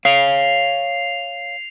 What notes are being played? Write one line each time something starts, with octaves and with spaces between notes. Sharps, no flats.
C#5 F5 C7 F7